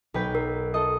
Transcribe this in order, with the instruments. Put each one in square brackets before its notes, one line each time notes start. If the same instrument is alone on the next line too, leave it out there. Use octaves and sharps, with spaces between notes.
[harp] B1 B4 G5
[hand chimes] A#4
[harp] A4 D#5